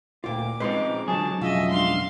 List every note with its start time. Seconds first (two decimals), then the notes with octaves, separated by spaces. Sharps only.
0.24 D2 A#2 F4 G5 D6
0.60 C#3 F3 G#3 C4 D#4 B4 C6
1.08 C#2 D3 F#3 G#4 A5
1.41 B1 F2 C#3 F4 D#5 E5
1.71 G#3 D4 F5 C6